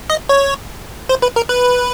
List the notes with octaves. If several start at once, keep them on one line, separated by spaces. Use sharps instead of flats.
D#5
C#5
C5
B4
A#4
B4